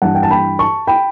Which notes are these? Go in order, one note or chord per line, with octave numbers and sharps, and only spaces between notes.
G2 E3 F#5 A5
G5
A5
G5 B5
A5 C#6
G5 B5